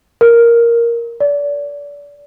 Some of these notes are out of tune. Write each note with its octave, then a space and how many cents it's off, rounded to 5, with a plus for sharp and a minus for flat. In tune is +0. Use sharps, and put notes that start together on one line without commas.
A#4 +5
D5 -30